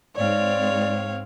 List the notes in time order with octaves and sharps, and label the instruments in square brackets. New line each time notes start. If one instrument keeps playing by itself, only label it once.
[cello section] G#2 C4 [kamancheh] C#5 F5 [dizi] D5